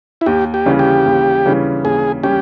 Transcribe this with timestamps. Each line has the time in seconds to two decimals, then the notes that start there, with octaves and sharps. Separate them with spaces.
0.21 E4
0.26 D#2 G4
0.54 G4
0.66 C#3 E3 G3 C#4
0.79 G4
1.06 D#2
1.46 C#3 E3 G3 C#4
1.84 D#2 G#4
2.23 G3 C#4 G4